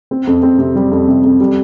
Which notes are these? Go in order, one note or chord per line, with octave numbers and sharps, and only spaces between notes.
C4
F2
C4
C3
G3
F2
C3
F2
G3